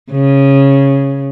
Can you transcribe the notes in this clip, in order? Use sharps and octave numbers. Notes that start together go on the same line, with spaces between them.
C#3